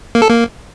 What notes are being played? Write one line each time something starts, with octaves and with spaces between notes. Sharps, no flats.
A#3
A4
A#3